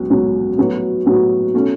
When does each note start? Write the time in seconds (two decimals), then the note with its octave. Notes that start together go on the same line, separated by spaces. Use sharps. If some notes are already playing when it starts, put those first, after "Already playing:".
Already playing: C#2 B2 F#3
0.10 C#2 B2 F#3
0.58 A2 F#3 B3 F#4
1.06 A2 F#3 B3 F#4
1.54 B2 A3 C#4